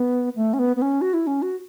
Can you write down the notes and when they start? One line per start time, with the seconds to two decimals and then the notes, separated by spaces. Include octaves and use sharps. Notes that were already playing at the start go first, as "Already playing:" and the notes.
Already playing: B3
0.36 A3
0.53 C#4
0.59 B3
0.76 B3
0.82 C#4
1.01 F#4
1.14 E4
1.27 C#4
1.42 F#4